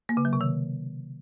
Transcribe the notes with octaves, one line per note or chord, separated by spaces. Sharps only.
A#3
C#3
F#3
C3
D#3